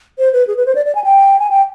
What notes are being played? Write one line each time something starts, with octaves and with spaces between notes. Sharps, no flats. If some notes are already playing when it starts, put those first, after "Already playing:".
C5
B4
G#4
B4
C5
D5
D5
G#5
G5
G#5
G5